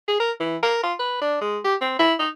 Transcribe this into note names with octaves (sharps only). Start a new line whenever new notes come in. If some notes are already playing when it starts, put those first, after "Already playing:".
G#4
A#4
E3
A#4
F4
B4
D4
G#3
G4
C4
E4
D#4